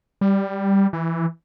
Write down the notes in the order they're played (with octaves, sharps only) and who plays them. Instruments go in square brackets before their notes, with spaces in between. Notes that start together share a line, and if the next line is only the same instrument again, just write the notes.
[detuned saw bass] G3
E3